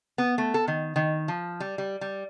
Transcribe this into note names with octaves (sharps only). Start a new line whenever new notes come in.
B3
A3
A4
D#3
D#3
F3
G3
G3
G3